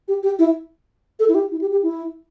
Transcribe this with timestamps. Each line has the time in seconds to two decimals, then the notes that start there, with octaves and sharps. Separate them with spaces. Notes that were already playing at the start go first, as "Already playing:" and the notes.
0.08 G4
0.23 G4
0.39 E4
1.19 A4
1.28 E4
1.35 G4
1.51 E4
1.61 G4
1.72 G4
1.83 E4